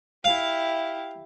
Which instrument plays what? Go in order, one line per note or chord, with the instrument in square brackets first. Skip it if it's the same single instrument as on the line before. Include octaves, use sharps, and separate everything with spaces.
[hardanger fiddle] E4 G4 [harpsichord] F5